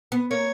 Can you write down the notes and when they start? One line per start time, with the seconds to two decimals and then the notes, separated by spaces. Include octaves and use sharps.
0.12 B3
0.31 A#3 C#5